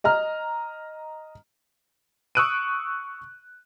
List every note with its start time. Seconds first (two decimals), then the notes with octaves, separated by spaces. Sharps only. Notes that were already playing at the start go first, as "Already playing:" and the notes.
0.04 D#5 A#5 F6
2.35 C#6 D#6 E6 F#6 D7 D#7